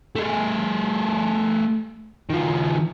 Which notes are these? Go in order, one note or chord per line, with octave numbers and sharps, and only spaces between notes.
A3 G#4
D#3 F3